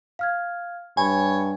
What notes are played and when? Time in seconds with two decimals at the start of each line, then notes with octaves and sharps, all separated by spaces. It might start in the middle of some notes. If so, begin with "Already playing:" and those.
0.19 F5 F6 G#6
0.97 G2 C#5 G#5 B5